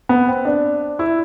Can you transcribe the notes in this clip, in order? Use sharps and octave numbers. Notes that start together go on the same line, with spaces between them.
B3
C4
D4
E4